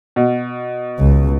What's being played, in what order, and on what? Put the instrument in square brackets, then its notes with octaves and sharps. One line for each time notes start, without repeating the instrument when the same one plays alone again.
[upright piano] B2
[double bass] C#2